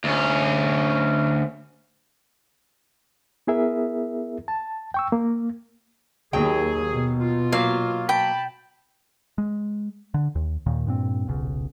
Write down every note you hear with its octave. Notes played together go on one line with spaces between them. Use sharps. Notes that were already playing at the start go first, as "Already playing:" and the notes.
D2 C#4
B3 E4 G#4 A#4 E5
A5
G5 C#6 E6
A#3
D#2 F#3 G#4 G5
B2
F4
F#3 A#3 F5
G5 A5 B5
G#3
D3
D#2
D#2 A#2 D#3
G2 A#2 C4
D#1 B1 C#3